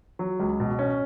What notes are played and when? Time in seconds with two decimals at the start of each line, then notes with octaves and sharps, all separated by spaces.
0.19 F#3
0.40 C#2
0.60 B2
0.79 C#4